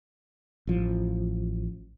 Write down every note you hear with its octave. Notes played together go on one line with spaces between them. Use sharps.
A1 F3